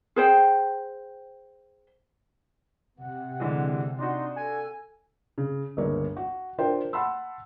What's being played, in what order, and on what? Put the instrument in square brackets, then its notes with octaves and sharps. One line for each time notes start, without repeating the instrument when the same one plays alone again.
[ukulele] G#4 C5 G5
[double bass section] C3 [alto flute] F#5
[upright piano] D3 E3 G#3
[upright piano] D4 F#4 [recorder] D#4 [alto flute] C6
[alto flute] A4 [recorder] G#5
[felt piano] C#3
G1 C#2 A#3 C#5
F#4
D4 F4 A#4 C5 G5
F#5 A5 B5 C6 E6